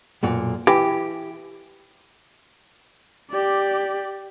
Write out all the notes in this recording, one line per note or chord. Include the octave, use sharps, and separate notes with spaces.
B1 F#2 A#2
E3 G4
G4 D5